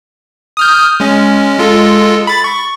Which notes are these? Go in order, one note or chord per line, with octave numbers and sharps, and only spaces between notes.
D#6 F6 G6
G#3 C#4
G#3 F4 A4
B5 A6
C#6